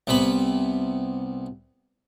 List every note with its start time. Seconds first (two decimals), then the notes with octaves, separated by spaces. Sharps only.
0.07 C2 C3 B3 B5